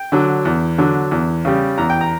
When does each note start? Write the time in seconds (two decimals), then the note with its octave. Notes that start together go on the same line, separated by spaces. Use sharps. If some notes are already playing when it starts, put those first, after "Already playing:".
Already playing: G5
0.12 D3 F#3
0.45 E2
0.78 D3 F#3
1.11 E2
1.45 C#3 G3
1.78 E2 A#5
1.90 G5
2.01 A#5